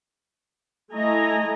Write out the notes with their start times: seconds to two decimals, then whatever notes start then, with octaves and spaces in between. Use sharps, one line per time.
0.93 A3 E4 D#5 G#5 A#5